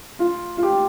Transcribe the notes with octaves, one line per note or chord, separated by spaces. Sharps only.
F4
F4
G4